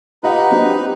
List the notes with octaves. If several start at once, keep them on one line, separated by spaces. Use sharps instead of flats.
D#4 F4 G4 B4 D#5 F#5
F#3 C4 D4